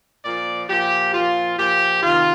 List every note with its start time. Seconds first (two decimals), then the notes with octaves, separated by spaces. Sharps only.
0.24 A#2 F3 D5
0.69 A#2 F3 G4
1.14 A#2 F3 F4
1.58 A#2 F3 G4
2.03 C3 D#3 F4